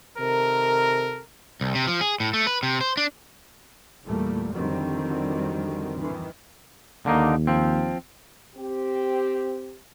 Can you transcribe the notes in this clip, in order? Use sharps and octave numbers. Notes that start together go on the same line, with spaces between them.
C3 D#3 A4 A#4
C2
C3
F3
G#4
A2
A3
B4
C3
C5
D4
E2 A#2 G3 A3 A#3
F2 D3 D#3 F#3 G3 C4
D#3 E3
D#2 D3 A#3 D#4
F3 C4
C4 G4